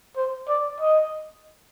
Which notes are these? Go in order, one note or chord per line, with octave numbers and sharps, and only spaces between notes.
C5
D5
D#5